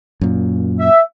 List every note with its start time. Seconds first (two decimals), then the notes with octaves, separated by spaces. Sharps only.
0.21 F#2 A#2
0.79 E5